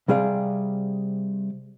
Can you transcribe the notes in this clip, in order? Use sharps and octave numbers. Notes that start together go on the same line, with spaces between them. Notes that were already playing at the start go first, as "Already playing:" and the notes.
C3 G3 G#4 D5 F5